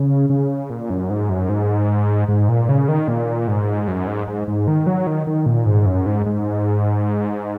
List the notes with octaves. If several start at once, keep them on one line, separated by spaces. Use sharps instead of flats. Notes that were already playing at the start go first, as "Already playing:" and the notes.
Already playing: C#3
C#3
A#2
F#2
G#2
F#2
G#2
G#2
A#2
C#3
D#3
A#2
G#2
F#2
G#2
G#2
G#2
D#3
F#3
D#3
D#3
A#2
G#2
F#2
G#2
G#2